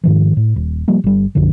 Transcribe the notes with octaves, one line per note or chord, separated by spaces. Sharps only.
G#2 D#3 F3
A2
D#1
F3 G3 A#3
G1 G3
B1 F#2 D3 F3